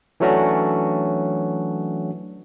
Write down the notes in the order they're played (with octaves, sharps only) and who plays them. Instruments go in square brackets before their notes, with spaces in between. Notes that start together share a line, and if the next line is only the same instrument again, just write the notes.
[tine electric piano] E3 F#3 A3 C#4 D4 F#4